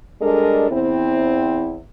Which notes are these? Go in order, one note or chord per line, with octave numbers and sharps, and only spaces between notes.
G3 G#3 D4 A4 A#4 D#5
E2 C4 E4